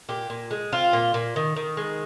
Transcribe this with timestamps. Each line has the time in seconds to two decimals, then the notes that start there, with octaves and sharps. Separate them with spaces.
0.09 A#2 G4
0.30 A#2
0.51 G#3
0.72 C4 F4
0.93 A#2
1.14 A#2
1.36 D#3
1.56 D#3
1.77 G#3